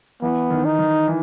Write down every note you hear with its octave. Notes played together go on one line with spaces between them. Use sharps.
E3 B3
D#3
D#4
D#3
E3